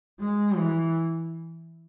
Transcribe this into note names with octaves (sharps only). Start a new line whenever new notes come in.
G#3
E3